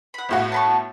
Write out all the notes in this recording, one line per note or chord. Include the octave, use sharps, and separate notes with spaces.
F#5 B5
G1 A2 F#4
A5 B5 C#6